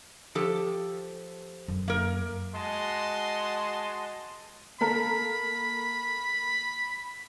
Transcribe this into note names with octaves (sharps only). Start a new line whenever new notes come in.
F3 G4 A4
F#2
A#3 A#4
G#3 F#4 D#5 A5 C6
A#3 A4 A#4 B5